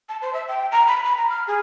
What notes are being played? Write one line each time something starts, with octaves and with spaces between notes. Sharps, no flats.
A5
C5
E5
G5
A#5
B5
B5
A#5
F6
G#4